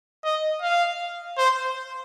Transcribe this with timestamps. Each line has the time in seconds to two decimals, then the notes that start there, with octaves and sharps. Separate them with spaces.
0.24 D#5
0.62 F5
1.37 C5